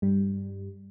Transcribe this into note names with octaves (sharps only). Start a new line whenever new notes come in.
G2 G3